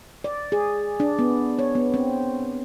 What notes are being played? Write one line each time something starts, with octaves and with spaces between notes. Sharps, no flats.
D5
G#4
D4
B3
C#5
B3
C4